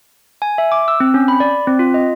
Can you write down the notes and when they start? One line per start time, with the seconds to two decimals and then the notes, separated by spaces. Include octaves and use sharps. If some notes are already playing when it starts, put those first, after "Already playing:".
0.42 G#5
0.58 E5
0.72 D6
0.88 E6
1.00 C4
1.14 C#4
1.28 B5
1.40 D5
1.67 C4
1.79 F4
1.94 D#5